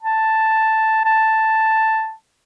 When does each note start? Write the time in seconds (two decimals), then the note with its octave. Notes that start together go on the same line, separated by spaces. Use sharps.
0.02 A5
1.05 A5